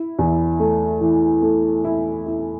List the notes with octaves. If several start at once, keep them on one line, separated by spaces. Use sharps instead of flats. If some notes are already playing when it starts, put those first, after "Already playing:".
Already playing: E4
E2
A3
E3
A3
E4
E4